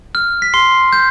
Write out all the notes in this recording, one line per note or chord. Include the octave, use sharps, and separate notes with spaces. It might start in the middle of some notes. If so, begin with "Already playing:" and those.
F6
B6
C6 C7
G6